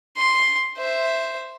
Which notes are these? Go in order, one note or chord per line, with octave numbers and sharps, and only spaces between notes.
C6
C5 E5